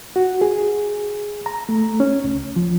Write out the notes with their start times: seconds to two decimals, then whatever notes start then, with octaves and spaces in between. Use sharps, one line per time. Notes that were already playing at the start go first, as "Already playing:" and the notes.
0.16 F#4
0.41 G#4
1.46 A#5
1.69 A3
2.00 C#4
2.24 C#2
2.56 F3